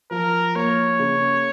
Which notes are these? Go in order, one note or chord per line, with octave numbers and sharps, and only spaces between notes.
F3 A#4
A#3 C#5
C#3